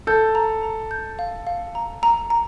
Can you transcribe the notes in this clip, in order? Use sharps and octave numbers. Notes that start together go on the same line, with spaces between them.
A4 G6
A#5
A#5
G6
F5
F5
A#5
A#5
A#5